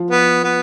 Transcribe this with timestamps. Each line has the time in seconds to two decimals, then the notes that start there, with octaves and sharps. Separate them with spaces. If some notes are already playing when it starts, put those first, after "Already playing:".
Already playing: F3
0.11 B3
0.44 B3